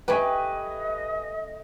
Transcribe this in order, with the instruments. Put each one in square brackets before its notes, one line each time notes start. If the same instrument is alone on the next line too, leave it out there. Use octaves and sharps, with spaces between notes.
[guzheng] A3 G4 [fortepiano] B4 G#5 [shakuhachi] D#5